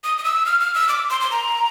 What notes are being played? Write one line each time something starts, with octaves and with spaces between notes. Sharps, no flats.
D#6
D#6
E6
F6
F6
E6
D6
C6
C6
A#5